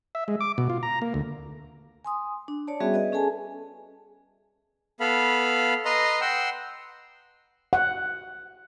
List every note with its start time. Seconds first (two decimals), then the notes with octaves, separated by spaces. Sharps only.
0.15 E5
0.28 G#3
0.41 D6
0.58 B2
0.70 F4
0.83 A#5
1.02 A#3
1.14 D2
2.05 G#5 C6 D#6
2.48 D4
2.67 C#5 D5 A5
2.80 G3 B3 C#4 F#4 G#4 E5
2.94 G#4 B4 D5 D#5
3.12 C#4 G#4 A4 G#5 A5
5.00 B3 A4 F5 B5
5.85 B4 D#5 A#5 C6
6.21 F#5 G5 C6 E6
7.73 F#5